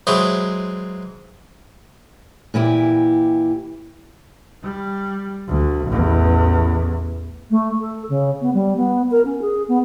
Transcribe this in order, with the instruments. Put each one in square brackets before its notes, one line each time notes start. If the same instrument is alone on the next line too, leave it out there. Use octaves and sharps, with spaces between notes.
[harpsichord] E3 F#3 G#3 C4 G#4
[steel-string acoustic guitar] A#2 E3 E4 G4
[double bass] G3
D2
A1 E2
[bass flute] A3
A4
C#3
B3
G3
B3
A#4
C#4
G#4
B3